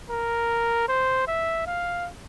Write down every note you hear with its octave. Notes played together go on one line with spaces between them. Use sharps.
A#4
C5
E5
F5